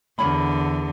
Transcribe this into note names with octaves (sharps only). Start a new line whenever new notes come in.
E2 D3 A#4 C#5 B5